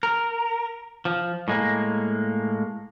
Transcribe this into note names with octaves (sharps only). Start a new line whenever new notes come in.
A#4
F3
A2 G#3 A#3